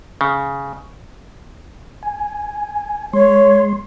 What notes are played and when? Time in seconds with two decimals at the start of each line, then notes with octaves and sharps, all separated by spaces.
0.21 C#3
2.03 G#5
3.13 G#3 C#5 C6